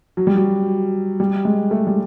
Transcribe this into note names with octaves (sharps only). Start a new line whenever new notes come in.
F#3
G3
F#3
G3
G#3
A3
G3